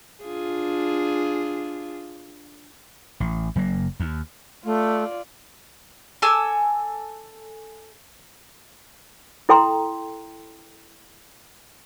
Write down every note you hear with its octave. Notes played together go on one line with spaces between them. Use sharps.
D4 F4 G#4
A1
F#1 F#3 A#3
D#2
A3 F4 D5
A4 G#5 D6 E6
E4 A4 G5 A#5 C6